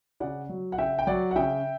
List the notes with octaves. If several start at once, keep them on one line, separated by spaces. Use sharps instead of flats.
C#3 D5 F#5
F#3
F#5
C#3 E5 G5
G5
F#3 D5 F#5
F#5
C#3 E5 G5